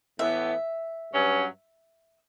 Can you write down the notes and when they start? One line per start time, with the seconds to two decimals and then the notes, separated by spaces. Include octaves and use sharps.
0.19 A2 E3 B3 E5
1.13 G2 F#3 C#4